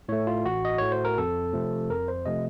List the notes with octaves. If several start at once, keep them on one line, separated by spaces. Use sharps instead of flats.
A2 A3 C#5
F4
A1 F#4
D#5
A2 A3 C#5
C5
A#4
F2 A4
C3 F3 A3
F2 A#4
C5
C3 F3 A3 D#5